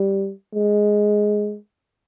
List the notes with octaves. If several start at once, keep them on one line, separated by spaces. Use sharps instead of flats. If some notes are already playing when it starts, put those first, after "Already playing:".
Already playing: G3
G#3